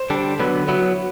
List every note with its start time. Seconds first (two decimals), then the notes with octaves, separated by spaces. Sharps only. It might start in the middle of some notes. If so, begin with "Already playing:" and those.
Already playing: C5
0.10 D3 G3 D4
0.39 D3 F#3 B3 B4
0.68 F#3 B3 E4